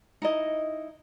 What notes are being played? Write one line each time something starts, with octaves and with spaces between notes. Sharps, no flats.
D#4 E4 D#5